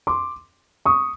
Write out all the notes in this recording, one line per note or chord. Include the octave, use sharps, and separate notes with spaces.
C6 D6
C#6 D#6